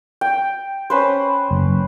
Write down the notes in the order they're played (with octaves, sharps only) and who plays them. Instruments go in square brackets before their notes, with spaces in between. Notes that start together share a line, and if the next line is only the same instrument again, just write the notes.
[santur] G5
C#4 B4 C5
[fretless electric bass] F#1